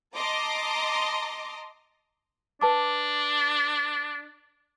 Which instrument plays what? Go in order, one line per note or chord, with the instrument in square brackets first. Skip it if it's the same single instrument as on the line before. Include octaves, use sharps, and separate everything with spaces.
[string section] D#5 A5 A#5 C6 D6
[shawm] D4 [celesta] B4 A5 D6